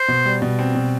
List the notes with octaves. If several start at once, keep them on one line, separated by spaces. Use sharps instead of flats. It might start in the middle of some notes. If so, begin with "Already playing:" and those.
Already playing: C5
B2
G3
B2
C4
B2